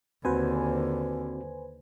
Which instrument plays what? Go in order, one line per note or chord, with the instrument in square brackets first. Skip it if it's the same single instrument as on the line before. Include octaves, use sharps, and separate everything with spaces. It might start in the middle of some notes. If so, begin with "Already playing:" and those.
[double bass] D#2 D3 [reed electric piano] C4 F#4 [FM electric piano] B4 C5 G#5